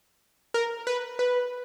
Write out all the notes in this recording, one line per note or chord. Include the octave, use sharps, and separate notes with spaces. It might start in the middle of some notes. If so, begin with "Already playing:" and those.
A#4
B4
B4